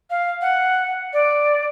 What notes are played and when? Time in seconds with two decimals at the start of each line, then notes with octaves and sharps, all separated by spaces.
0.10 F5
0.42 F#5
1.13 D5